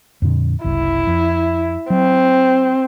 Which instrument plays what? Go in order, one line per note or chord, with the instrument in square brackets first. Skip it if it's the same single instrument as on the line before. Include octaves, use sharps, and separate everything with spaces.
[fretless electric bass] F2 A#2 D3
[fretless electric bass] F#1 C2 [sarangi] E4
[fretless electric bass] F2
[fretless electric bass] F#3 [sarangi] C4